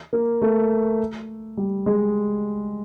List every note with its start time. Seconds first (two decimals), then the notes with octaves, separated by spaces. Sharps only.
0.13 A#3
0.42 A3
1.57 G3
1.86 G#3